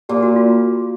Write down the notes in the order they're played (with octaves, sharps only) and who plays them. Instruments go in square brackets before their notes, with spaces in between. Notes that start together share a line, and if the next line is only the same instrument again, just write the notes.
[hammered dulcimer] A#2 [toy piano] G4
[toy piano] F#4
F4